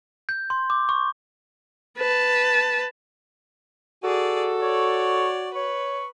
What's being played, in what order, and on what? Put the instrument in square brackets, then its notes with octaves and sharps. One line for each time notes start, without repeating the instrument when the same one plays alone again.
[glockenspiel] G6
C6
D6
C#6
[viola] B4 A5
[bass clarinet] F#4 [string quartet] G#4 D5 [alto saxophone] A4
[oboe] C#5 [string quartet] D5
[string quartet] B4 [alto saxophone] C#5 [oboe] C#6